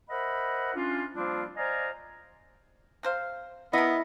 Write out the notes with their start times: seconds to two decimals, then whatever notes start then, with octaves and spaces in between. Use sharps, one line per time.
0.10 A#4 C5 D#5 E5 F#5 B5
0.75 C#4 D4 F4
1.15 F3 G3 A#3 C4 D4 F4
1.57 C5 D5 D#5 F5 G#5 A#5
3.03 C3 C5 F5
3.73 B3 E4 A#4 D#5